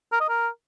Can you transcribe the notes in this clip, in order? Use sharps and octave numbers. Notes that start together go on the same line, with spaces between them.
A#4
D#5
A#4